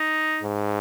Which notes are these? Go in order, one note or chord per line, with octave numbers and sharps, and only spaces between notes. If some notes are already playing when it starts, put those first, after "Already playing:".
Already playing: D#4
G#2